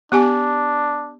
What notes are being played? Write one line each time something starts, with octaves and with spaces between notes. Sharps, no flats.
B3 D4 G4 G#5